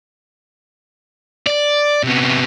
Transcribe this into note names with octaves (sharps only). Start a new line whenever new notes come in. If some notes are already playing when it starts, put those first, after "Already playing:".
D5
C3 B3